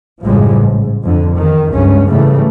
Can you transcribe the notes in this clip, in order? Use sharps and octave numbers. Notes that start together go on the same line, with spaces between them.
A1 F#2 C#3 F3 G3 G#3
G#2
F2 D3
E2 D#3
C#2 G2 G#3 C#4
G#2 C#3 E3 G3 A3